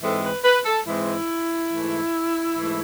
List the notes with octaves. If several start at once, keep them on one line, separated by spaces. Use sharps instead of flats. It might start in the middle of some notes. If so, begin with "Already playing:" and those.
G#2 E3 G#3 C4 A4
B4
B4
A4
G#2 E3 G#3 C4 E4
G#2 E3 A3
G#2 E3 A3